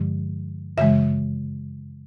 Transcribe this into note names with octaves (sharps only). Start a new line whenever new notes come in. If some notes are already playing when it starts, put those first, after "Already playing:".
Already playing: G2 D3 F3 G#3
F#2 C#3 E3 G#3 E5